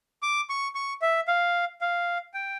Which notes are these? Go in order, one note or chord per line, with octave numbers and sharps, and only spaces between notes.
D6
C#6
C#6
E5
F5
F5
G5